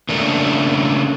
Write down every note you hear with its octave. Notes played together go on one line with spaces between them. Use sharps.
C#3 A3 A#3 D4